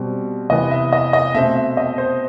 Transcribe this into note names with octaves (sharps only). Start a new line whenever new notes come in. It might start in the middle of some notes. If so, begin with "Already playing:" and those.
Already playing: B2 G3 C4
C3 E3 B3 D#5
E5
D#5
D#5
B2 A3 C4 E5
E5
D#5
C5